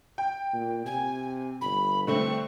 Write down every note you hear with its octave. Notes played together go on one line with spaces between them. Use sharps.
G5
A#2
C3 G#5
G1 B5
D3 A3 C4 C#6